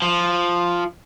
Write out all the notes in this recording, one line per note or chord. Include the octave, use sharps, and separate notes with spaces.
F3